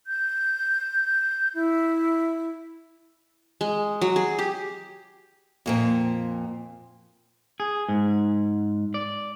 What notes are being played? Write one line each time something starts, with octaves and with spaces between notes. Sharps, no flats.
G6
E4
G#3
F#3
G#4
G4
F2 A#2 C4
G#4
G#2
D5